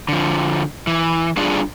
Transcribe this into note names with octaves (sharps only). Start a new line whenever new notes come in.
D3 F3
E3
G3 D4 F4 G#4 D5